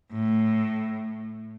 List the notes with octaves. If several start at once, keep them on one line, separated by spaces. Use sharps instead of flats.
A2